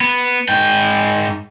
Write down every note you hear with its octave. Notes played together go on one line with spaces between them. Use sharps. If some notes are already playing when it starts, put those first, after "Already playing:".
B3
G#2 G5